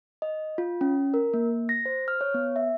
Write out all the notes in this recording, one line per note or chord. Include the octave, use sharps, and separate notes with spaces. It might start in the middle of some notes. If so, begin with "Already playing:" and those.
D#5
F4
C#4
A#4
A#3
A#6
C5
F6
C#5
B3
E5